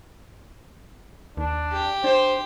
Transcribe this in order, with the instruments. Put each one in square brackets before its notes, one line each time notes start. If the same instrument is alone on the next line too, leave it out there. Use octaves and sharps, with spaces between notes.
[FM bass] D#2 [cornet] D4
[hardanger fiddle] G4
[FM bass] D4 [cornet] C5